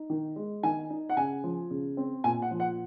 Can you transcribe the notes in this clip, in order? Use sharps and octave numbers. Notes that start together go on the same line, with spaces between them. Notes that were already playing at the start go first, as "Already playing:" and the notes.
Already playing: D#4
D#3
G#3
D#3 G#5
D#4
F#5
C#3 G#5
F3
C#3
C4
A#2 G#5
F#5
F3
F#5